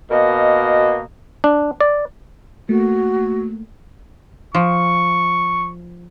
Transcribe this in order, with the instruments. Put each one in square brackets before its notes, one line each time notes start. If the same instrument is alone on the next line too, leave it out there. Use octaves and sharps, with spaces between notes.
[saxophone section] B2 A#3 A#4 D#5
[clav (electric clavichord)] D4
D5
[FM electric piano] A3 A#3 [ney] F#4
[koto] F3 [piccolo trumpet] C#6